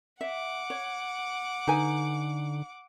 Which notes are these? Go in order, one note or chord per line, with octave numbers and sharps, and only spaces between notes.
E5 F#5 D6
C#5
D3 D#4 B4 G#5